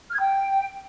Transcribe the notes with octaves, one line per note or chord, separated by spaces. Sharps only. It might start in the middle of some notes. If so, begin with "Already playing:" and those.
F6
G#6
G5